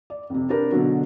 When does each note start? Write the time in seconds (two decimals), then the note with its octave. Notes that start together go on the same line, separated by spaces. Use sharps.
0.10 D5
0.30 F2 C3
0.49 D4 G4 A#4 B4
0.72 B2 D3 F#3